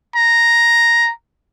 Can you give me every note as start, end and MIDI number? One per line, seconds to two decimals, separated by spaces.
0.16 1.11 82